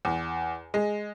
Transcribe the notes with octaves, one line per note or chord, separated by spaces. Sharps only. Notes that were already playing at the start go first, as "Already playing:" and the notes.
E2
G#3